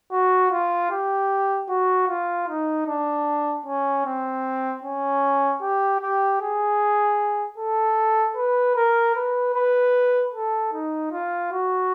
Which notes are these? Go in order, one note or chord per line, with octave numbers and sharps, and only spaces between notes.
F#4
F4
G4
F#4
F4
D#4
D4
C#4
C4
C#4
G4
G4
G#4
A4
B4
A#4
B4
B4
A4
D#4
F4
F#4